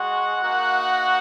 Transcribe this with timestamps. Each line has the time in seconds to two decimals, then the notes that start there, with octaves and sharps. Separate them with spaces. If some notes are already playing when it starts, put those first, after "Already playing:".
Already playing: G#3 F#4 F#5
0.42 A#3 D#4 F#4